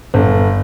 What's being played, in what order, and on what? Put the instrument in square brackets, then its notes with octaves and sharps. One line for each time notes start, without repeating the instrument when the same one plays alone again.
[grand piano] G1